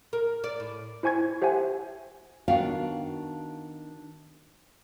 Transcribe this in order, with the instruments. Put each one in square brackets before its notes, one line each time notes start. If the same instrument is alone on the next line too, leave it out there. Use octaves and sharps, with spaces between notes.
[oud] A#4
D5
A2
[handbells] E4 C5 G#5 C#6 G#6
G4 C5 E5 F#5 G#5
[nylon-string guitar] D#3 B3 D4 F#4 F5 G5